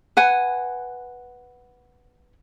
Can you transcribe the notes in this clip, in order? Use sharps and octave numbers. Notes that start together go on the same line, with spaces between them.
B4 F#5 G#5